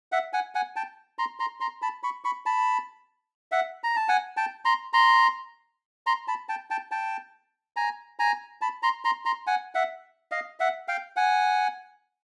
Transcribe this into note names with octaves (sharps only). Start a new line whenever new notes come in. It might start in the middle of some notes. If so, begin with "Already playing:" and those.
E5 F#5
F#5 G#5
F#5 G#5
G5 A5
A#5 C6
A#5 C6
A#5 C6
A5 B5
B5 C#6
B5 C#6
A5 B5
E5 F#5
A#5
A5
F#5 G#5
G5 A5
A#5 C6
A#5 C6
A#5 C6
A5 B5
G5 A5
G5 A5
G5 A5
G#5 A#5
G#5 A#5
A5 B5
A#5 C6
A#5 C6
A#5 C6
F#5 G#5
E5 F#5
D#5 F5
E5 F#5
F5 G5
F#5 G#5